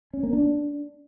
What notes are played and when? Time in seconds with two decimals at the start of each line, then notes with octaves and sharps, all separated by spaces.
0.13 C#4
0.23 A#3
0.33 D4